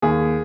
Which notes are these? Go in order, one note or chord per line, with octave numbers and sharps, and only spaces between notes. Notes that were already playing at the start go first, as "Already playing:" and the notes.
D#2 G#4